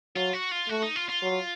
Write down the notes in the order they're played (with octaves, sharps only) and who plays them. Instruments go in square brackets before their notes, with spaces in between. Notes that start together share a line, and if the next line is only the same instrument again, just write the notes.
[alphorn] F#3 [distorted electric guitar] F4
[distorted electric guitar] F#4
F4
[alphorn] A3 [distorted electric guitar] F#4
[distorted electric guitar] D#4
F4
F4
[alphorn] F#3